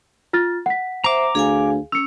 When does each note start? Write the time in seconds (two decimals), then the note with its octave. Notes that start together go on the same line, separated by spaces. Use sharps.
0.33 F4 F6 A6
0.66 F#5 B6
1.04 C5 E5 A#5 D6
1.35 D2 G#4 F5 G#5
1.92 C#4 E6 C#7